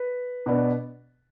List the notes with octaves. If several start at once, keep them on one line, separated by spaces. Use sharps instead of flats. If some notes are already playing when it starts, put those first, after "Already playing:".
Already playing: B4
B2 B3 D4